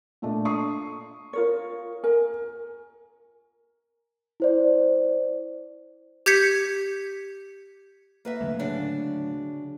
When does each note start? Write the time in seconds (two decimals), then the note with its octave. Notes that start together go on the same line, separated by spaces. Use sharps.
0.22 A#2 A3 D4
0.45 C#6 D#6 C7
1.33 F4 A#4 C#5
2.04 A#4 G#5
4.40 E4 C5 D5
6.26 G4 G6 G#6 B6 C#7
8.25 A#3 B4 E5
8.41 D3 F#3 A3
8.59 C#3 D4 F#4